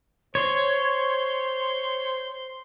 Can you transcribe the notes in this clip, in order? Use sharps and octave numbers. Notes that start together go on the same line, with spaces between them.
C5 C#5 C6